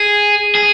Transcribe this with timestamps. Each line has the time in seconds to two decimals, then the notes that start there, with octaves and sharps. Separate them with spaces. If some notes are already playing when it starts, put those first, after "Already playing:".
Already playing: G#4
0.55 G#4